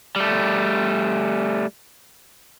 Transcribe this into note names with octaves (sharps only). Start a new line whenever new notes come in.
G3 A3